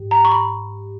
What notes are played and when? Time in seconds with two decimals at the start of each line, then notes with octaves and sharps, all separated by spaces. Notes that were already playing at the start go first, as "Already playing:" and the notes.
Already playing: G#2 G4
0.11 A#5
0.25 C#6
0.32 B5